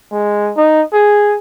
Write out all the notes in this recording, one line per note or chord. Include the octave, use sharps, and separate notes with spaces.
G#3
D#4
G#4